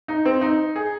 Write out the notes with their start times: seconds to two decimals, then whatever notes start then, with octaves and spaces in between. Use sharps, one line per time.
0.08 D#4
0.25 C4
0.41 D#4
0.76 G#4